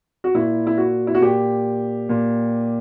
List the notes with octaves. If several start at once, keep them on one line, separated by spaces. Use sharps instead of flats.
F#4
A#2 E4
E4
F#4
E4
F#4
A#2 G4
A#2